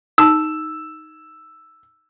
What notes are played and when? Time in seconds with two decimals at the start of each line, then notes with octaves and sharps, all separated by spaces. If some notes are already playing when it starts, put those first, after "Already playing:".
0.18 D#4 A5 E6